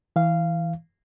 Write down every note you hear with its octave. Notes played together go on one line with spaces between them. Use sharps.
E3 F5